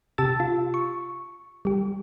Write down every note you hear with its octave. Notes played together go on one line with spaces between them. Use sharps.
C3 G4 A5 E6 A6
F4
C#6
G3 G4